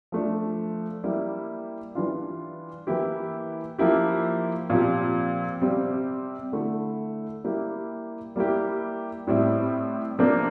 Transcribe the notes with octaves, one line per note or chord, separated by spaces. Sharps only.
F3 A3 D4
G3 A#3 E4 G4
E3 G3 D4 F4
E3 A#3 E4 G4
F3 A#3 E4 G4
A#2 F3 C4 G4
C3 G3 C4 G4
D3 A3 E4
G3 A#3 E4 G4
G3 A#3 E4 G4
A2 G3 C4 E4
C3 F3 A#3 D4